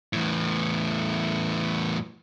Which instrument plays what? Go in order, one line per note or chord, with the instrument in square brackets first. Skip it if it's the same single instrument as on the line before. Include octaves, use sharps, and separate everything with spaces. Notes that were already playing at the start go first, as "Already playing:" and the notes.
[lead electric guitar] E2 A2